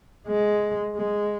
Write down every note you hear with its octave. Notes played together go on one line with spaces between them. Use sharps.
G#3
G#3